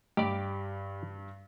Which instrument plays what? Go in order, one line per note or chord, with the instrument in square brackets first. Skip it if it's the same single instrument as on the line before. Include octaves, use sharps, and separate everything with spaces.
[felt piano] G2 B5 [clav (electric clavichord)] G4 D5